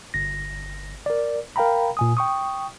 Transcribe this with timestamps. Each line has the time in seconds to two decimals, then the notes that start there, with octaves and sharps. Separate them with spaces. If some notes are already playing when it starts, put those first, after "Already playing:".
0.14 G1 A#6
1.06 A#4 D5
1.56 A#4 F5 G5 A#5 B5
1.97 A#2 G#5 D#6
2.17 G5 C#6 D#6